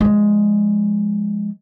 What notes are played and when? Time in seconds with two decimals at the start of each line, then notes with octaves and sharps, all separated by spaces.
0.01 F3 G#3